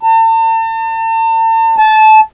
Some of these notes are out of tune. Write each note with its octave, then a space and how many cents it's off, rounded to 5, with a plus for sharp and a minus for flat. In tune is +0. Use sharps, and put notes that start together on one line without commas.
A5 +40
A5 -20